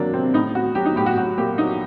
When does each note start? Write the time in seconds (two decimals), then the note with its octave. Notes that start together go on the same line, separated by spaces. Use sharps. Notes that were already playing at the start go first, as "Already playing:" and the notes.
Already playing: C3 D#3 F#3 A#3 D4
0.13 C3 C4
0.34 A2 D#4
0.55 A2 F#4
0.75 F#3 G4
0.86 D#4
0.96 A2 G4
1.06 F#4
1.17 F#3 F#4
1.38 A#2 G4
1.58 F#3 D#4